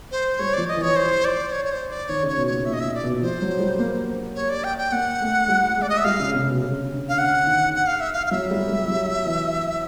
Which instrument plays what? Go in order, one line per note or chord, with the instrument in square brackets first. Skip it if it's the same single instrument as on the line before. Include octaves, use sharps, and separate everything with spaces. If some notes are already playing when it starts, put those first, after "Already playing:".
[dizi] C5
[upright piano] G3 [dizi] C#5
[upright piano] F3 [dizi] D5
[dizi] D#5
[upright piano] E3 [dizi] C#5
[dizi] C5
D5
C#5
C#5
C5
D5
[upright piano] D#3 [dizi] C#5
[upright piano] C#3 [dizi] C#5
[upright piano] B2
[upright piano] A#2 [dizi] C#5
[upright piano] A#2 [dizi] E5
[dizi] D#5
[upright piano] A#2 [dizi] E5
[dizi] D5
[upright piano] B2
[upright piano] F3 [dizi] C5
[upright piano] F#3
G3
A#3
[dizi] C#5
D5
G5
G5
[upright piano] A#3 [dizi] F#5
[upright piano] A3
G3
[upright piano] G#3 [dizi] D5
[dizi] D#5
E5
[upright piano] G3 [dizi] F5
[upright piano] C#3
C3
B2
C#3
D3
[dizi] F5
[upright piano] D3 [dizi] F#5
[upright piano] D#3
[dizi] F#5
F5
E5
F5
F5
[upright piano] F#3 [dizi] E5
[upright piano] G3
G3
F#3
E3